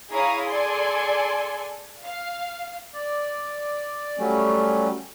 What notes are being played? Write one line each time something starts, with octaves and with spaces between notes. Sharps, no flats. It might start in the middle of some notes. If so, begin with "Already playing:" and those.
E4 G#4 C#5 F5 A#5 D#6
G#4 A4 D5 G#5 C6
F5
D5
F#3 G3 A3 C#4